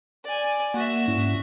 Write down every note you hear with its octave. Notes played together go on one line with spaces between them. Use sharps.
D5 G#5
A#3 F#4 E5 F#5
G#2 C#4 E4